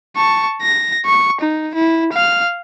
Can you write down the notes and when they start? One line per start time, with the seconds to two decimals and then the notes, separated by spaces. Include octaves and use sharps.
0.16 A5 C#6
0.62 A#6
1.06 C#6
1.40 D#4
1.75 E4
2.13 F5 F6